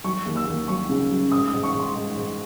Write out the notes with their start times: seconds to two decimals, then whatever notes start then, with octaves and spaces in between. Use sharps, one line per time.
0.04 F#3 C#6
0.26 D#2
0.36 E6
0.47 D#2
0.68 F#3 C#6
0.89 C#3
1.10 F#3
1.32 G#2 D#6
1.47 D#6
1.53 G#2
1.63 C#6
1.74 G#2
1.79 C6
1.95 G#2
2.16 G#2